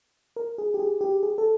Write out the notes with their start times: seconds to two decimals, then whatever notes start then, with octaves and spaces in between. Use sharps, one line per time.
0.36 A#4
0.58 G#4
0.74 G4
0.79 G#4
1.01 G4
1.23 G#4
1.38 A4